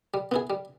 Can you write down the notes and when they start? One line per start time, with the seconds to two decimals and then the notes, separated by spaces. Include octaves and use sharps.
0.14 G3
0.32 B3 E4 G#4
0.50 G3